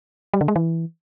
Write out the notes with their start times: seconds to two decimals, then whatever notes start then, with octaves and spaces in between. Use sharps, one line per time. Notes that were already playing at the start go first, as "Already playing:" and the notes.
0.34 G3
0.41 D3
0.48 G#3
0.56 E3